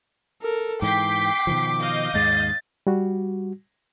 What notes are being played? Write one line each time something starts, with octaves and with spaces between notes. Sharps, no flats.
A4 A#4
G#2 E3 G5 D6 B6 C7
B2 D#3 F3
D#5 F5 G6
D#2 G#2 G#3 A6
G3 F#4